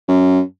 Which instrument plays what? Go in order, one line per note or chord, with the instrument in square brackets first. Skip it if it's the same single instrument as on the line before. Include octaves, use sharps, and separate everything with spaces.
[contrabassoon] F#2